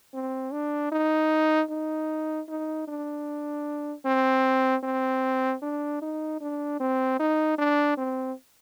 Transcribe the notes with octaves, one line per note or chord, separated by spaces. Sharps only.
C4
D4
D#4
D#4
D#4
D4
C4
C4
D4
D#4
D4
C4
D#4
D4
C4